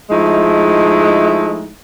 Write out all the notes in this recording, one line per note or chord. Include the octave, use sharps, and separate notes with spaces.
F3 G#3 A3 D#4 E4